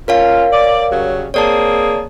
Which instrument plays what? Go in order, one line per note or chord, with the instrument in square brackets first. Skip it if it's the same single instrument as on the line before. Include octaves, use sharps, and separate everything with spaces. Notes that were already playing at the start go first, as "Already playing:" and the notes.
[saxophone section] C#4 F4 [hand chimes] A#4 C#5 F5
[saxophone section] D5
C#3 F#3 G3
[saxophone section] A#3 C4 G#4 [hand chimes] C#5 D5 A5